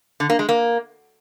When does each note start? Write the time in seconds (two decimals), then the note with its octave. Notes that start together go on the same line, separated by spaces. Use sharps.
0.20 D3
0.30 A#3
0.39 G#3
0.49 A#3